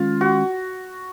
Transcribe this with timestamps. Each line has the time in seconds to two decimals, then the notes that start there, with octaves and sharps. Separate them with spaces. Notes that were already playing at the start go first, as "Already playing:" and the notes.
Already playing: D#3 G#3 C#4 F4
0.21 F#4